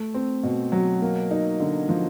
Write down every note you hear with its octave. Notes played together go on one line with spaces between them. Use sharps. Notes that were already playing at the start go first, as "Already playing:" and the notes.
Already playing: A3
C4
B2
F#3
A#3
D#4
D3
F3